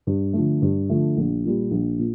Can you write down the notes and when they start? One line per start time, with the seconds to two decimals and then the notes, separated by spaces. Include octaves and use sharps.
0.07 G2
0.33 D3 F3 A3
0.62 G2
0.89 D3 F3 A3
1.17 A#1
1.45 A#2 G3
1.71 A#1
1.99 A#2